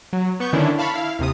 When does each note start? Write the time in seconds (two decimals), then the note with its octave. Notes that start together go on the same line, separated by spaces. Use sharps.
0.13 F#3
0.40 B3 C#6 G6
0.53 D3 D#3 C#4 D4 E4
0.79 F5 A5 B5 C#6
0.94 E4 F5
1.19 D#2 C3 D#6